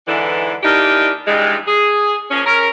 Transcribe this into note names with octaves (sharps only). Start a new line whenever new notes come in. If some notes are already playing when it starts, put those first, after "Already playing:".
G#2 D3 E3
E3 A#3 D4 D#4 G4
G2 E3 G3 G#3
G#4
F3 A#3 C#4
C#4 A#4